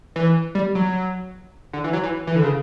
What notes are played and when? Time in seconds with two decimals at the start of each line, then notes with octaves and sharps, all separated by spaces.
0.16 E3
0.55 G3
0.75 F#3
1.73 D3
1.84 E3
1.93 F#3
2.03 E3
2.27 E3
2.36 D3
2.43 C#3